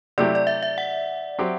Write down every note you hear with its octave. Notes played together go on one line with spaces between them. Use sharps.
C3 F#3 A3 E4 G4 D5
D5
E5
E5
F#5
F#3 C4 G4